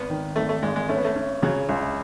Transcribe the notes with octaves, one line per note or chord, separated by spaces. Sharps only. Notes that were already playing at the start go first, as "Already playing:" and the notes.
Already playing: G#1 B3
D#3
G#1 A3
A3
G#1 G#3
G#3
A3 C#4
B3
A3
C#4
C#3 F#3
C#2